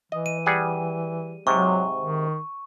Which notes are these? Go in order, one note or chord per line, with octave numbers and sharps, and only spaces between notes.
E3 D#5
D#7
G3 G#4 F#5
G#2 C3 F#3 C#6
D#3